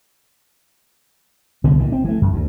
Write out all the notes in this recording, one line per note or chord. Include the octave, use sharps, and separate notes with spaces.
C2 D3 B3
A#2 D#3
C4
E3 A3
F#2
D2